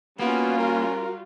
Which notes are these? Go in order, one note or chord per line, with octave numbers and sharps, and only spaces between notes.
G3 A#3 B3 C#4 F4 F#4
A#4